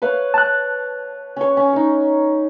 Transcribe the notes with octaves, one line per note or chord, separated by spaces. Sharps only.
B4 C#5 F5
A5 F#6
C#4 C#5
C#4
D#4 C#5